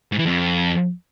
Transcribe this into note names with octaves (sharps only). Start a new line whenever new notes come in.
G#2
E3
F2